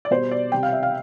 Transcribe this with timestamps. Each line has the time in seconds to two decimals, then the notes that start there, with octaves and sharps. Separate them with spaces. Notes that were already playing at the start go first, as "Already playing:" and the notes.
0.05 D5
0.11 B2 G3 C5
0.31 D5
0.52 C3 G3 G5
0.63 F5
0.73 E5
0.83 F5